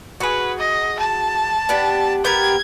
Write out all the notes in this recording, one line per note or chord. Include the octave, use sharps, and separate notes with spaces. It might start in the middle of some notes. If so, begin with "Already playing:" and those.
F#4 G#4 B4
D#5
A5
B3 D4 G4
B3 G4 A#4 G#6